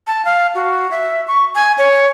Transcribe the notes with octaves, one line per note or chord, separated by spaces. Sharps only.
A5
F5
F#4
E5
C#6
G#5
C#5